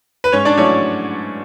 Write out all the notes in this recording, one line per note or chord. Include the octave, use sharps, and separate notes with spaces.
B4
G#2 C#4 C#5
D4 D5
F#3 A3 C#4 E4 C#5